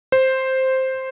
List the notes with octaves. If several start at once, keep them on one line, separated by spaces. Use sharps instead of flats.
C5